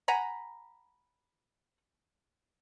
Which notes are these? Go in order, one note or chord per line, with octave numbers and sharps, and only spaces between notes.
F#5 G#5 A#5 B5